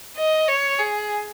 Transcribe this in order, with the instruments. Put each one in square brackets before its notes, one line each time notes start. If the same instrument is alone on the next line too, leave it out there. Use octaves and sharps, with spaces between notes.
[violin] D#5
C#5
G#4